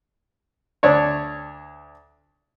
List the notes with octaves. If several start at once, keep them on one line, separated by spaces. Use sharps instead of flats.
D2 D4 C#5